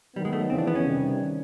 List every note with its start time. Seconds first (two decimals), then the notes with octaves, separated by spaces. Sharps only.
0.16 D#3 F#3 G3 B3
0.25 G#3
0.33 A3
0.50 F2 C#3 E3 C4
0.58 D4
0.67 B3
0.75 C#4
0.85 C3 D#3 G3